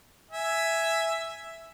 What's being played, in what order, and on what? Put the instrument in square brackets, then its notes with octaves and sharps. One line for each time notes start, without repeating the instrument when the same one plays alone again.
[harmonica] E5 G#5